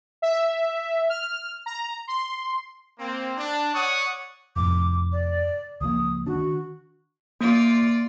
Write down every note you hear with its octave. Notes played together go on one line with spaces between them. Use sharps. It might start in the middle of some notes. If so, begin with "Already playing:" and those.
E5
F6
A#5
C6
A#3 C4
D4
C#5 D5 F#5 C#6 D#6
F1 F2 A2 D6
D5
C#2 F3 A#3 D#6
D#3 D4 F#4
A#3 F4 D5